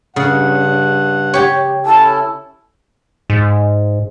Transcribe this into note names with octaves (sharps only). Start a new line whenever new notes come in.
G2 C#3 F#5
G4 C#5
C#4 E4 A4 A5
G#2